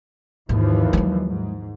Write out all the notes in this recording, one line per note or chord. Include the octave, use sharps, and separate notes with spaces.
D#2 G#2 E3 F3
F#3 G#3
G#2